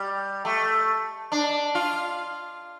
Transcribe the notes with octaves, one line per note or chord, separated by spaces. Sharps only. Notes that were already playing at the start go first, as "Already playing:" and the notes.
Already playing: G3
A3
D4
F4